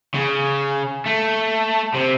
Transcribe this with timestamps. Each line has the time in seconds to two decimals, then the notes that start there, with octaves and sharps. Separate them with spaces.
0.15 C#3
1.06 A3
1.94 C3